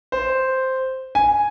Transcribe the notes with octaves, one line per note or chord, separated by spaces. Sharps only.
C5
G#5